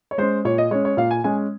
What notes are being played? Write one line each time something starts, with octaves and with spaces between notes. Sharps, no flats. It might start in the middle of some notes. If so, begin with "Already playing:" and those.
C#5
G#3 C#4 C5
A#2 C#5
D#5
G#3 C#4 C#5
C#5
A#2 F5
G#5
G#3 C#4 G#5